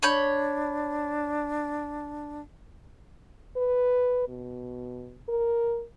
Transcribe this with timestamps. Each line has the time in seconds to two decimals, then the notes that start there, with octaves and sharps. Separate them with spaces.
0.03 D4 C#5 B5 G6
3.57 B4
4.28 B2
5.29 A#4